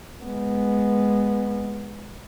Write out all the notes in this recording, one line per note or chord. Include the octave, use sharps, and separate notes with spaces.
G#3 B3